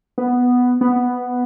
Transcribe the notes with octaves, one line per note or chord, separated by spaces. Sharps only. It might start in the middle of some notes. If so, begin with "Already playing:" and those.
B3
B3